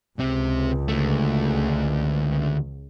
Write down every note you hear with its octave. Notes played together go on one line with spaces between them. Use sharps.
C#2 C3 C4
D2 A3